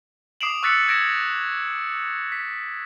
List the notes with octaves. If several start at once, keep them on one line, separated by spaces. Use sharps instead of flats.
D6 D#6 C7 D7 E7 F#7
C#6 E6 F#6 A6 B6 C#7
E6 G#6 A#6 D7 E7
B6